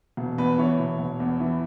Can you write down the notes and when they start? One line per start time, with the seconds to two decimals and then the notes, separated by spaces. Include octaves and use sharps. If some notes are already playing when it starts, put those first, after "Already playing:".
0.17 E1
0.38 E2 B4
0.58 E3 C#5
0.79 E1
0.99 E1
1.20 E2
1.40 E3